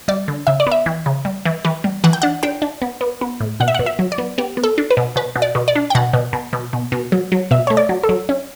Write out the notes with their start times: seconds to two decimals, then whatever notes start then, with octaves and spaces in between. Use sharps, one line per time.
0.08 G3 D5
0.28 D3
0.47 C#3 E5
0.60 D5
0.67 B3 E5
0.86 E3
1.06 C#3
1.25 G3
1.45 E3
1.65 E3
1.84 G3
2.04 E3 F#5
2.13 G5
2.22 D4 F#5
2.43 D4 G5
2.62 D4
2.82 B3
3.01 B3
3.21 B3
3.40 A2
3.60 B2 F#5
3.68 E5
3.75 B2 F#5
3.86 E5
3.99 F#3
4.12 D5
4.18 B3
4.38 B3 G4
4.57 B3
4.64 A4
4.78 D4
4.90 B4
4.97 B2
5.16 B2 B4
5.36 B2
5.42 D5
5.55 B2
5.68 D5
5.75 D4
5.90 G5
5.95 B2 F#5
6.13 B2
6.33 B2
6.53 B2
6.73 B2
6.92 B2
7.12 F#3
7.32 F#3
7.51 B2 E5
7.67 A3 C#5
7.77 D5
7.89 F#3
8.03 A4
8.09 F#3
8.29 C#4